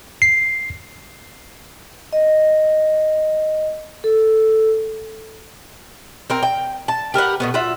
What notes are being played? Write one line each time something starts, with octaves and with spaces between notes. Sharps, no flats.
C7
D#5
A4
C4 A#4 G5
G5
A5
G4 A#4 B4 F#5
B2 A3 B3
F4 F#4 E5